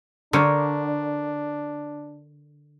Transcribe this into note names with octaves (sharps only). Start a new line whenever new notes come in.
D3 D4 A#4 C5 C#5